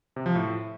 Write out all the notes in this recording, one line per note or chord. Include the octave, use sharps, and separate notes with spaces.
C3
F3
A2